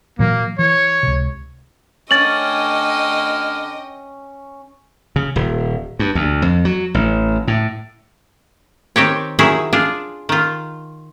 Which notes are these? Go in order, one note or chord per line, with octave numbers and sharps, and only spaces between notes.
A#2 E3 F#3 A#3
E3 C#5
C#2 C3
D3 C#4 D#5 G5 D6 F6 A6 F#7
C#3
D#1
G2
D2
F2
F#3
A1
A2
D#3 C4 G4 C#5
D#3 F#3 E4 G#4
D4 F4 G#4
D#3 F4